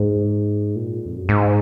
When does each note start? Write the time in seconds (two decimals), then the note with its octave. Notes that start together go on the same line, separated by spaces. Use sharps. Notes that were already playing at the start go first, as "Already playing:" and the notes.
Already playing: G#2
0.76 A#2
1.06 F2
1.17 F#2
1.29 G#2